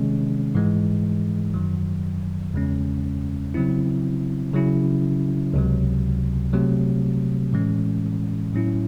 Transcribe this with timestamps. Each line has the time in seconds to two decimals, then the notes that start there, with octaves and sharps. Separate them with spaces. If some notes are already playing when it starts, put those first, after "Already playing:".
Already playing: C3 D#3 G#3 C#4
0.55 G#2 E3 G#3
1.54 F#2 D#3 F#3
2.54 E2 C#3 G#3 C#4
3.54 C#3 F#3 C4 E4
4.54 C#3 F#3 C#4 E4
5.54 C#2 C3 F#3
6.53 C3 F#3 A3
7.53 A2 E3 G#3 C#4
8.53 A2 F#3 C#4 E4